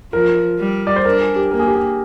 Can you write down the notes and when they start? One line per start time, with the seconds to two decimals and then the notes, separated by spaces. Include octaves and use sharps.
0.13 F3 A#4
0.59 G3
0.87 D5
0.96 C5
1.05 D4 A#4
1.21 G#4
1.36 G4
1.51 A#3 A#4
1.59 G#4
1.68 G4
1.75 G#4